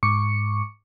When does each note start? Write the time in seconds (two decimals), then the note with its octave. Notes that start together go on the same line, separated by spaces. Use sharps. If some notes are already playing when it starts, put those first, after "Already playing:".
0.03 G#2 C#6 D6 C#7